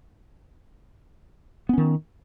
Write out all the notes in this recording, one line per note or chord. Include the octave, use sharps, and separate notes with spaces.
D#3 B3 C#4